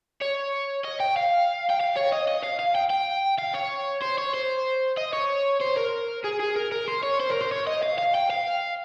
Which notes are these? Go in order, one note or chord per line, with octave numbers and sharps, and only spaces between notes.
C#5
D#5
G5
F5
G5
F5
C#5
D#5
D#5
F5
F5
G5
G5
F5
C#5
C5
C#5
C5
D#5
C#5
C5
A#4
G#4
G#4
A#4
A#4
C5
C#5
C5
A#4
C5
C#5
D#5
F5
F5
G5
F5